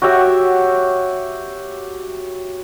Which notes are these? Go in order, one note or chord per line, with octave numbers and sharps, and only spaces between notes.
F#4 G4 C#5 E5